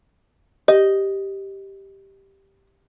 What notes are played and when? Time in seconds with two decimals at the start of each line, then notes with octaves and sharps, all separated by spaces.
0.68 G4 D#5